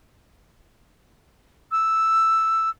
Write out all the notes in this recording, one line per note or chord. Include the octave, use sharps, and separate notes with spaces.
E6